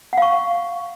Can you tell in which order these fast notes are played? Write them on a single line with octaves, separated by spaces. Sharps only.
F#5 F5 C#6